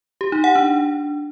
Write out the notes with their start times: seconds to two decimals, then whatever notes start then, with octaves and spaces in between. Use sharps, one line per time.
0.21 G4
0.32 D#4
0.44 F#5
0.55 D4